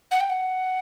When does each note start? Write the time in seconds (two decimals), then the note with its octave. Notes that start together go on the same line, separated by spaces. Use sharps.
0.11 F#5
0.20 G5
0.29 F#5